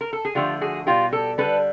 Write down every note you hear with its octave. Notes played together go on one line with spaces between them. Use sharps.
A#4
A4
G#4
D3 F3 A3 F4 G4
F#4 G#4
B2 G3 F4 G4
G4 A4
D3 G3 A4 B4